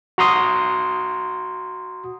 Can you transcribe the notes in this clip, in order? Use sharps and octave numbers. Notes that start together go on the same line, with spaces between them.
F#4 A#5 C6 D#6